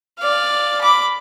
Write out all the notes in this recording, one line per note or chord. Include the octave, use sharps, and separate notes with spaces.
D5 F5
B5 D6